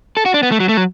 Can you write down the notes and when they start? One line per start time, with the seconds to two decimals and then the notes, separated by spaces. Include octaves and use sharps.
0.17 A4
0.26 F#4
0.34 D4
0.43 B3
0.51 A3
0.60 F#3
0.69 A3
0.77 F#3